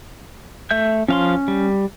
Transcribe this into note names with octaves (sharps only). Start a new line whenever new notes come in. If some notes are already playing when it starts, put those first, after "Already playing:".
A3 E5 G6
F3 C#4 F5 C6
G3